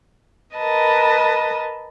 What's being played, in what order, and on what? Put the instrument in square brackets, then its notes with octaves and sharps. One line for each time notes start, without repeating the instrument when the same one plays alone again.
[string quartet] A#4 B4 D#5 A5